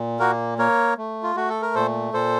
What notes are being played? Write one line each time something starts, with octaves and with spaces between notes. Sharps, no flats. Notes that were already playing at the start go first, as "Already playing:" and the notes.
Already playing: A#2
A#3 F#4 A#4
A#3 A#4 C#5
A3
F4
A3 F#4
A4
A#4
A#2 A4 C5
A#2 A4 C5